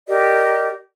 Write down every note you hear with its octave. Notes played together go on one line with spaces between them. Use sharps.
G4 A#4 D5 D#5